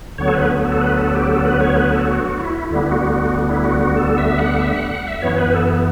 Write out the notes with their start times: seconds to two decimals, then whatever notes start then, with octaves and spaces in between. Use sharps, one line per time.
0.18 D2 D3 F#3 B3 C#5
0.28 A4
0.34 B4
0.66 A4
0.81 B4
0.97 A4
1.14 G4
1.29 A4
1.45 B4
1.61 C#5
1.76 B4
1.92 A4
2.08 F#4
2.39 E4
2.70 D2 D3 G3 B3 E4
2.91 F#4
3.13 F#4
3.49 E4
3.65 F#4
3.81 F#4
3.96 A4
4.18 E5
4.38 F#5
4.59 E5
4.76 F#5
4.91 F#5
5.07 E5
5.22 F#2 E3 B3 C#5
5.38 B4
5.53 A4